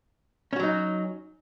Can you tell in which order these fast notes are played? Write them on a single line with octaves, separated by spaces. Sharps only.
C#4 F#4 F#3 D#4